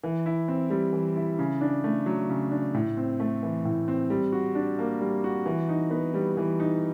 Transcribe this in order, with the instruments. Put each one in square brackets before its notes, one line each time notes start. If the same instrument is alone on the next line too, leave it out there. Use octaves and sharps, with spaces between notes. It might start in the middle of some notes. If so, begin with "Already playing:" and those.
[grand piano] E3
E4
C4
G3
E3
E4
C#3
D4
A3
F#3
C#3
D4
A2
C4
A3
E3
A2
C4
G3
F#4
D4
A#3
G3
F#4
E3
D#4
B3
G3
E3
D#4